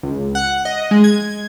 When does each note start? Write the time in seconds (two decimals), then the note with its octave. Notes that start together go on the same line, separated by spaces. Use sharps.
0.03 C#2
0.35 F#5
0.65 D#5
0.91 G#3
1.04 G#6